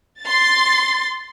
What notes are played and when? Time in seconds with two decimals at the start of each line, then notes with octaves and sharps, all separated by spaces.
0.22 C6 A6